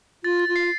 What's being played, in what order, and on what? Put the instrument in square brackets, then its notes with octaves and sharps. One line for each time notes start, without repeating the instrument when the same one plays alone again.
[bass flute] F4 [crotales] A6
[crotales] A6
[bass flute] F4
[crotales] C7